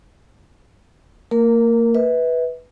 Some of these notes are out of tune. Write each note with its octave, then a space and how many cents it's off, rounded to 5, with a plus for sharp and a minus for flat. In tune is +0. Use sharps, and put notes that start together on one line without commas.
A#3 -30 A#4 +0
B4 +0 E5 -35